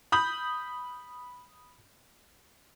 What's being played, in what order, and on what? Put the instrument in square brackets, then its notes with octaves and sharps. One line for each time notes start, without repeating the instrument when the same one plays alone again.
[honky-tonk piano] B5 D#6 G6 F#7